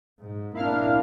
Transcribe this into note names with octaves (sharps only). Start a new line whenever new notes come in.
G#2
A#3 D4 E4 F5 F6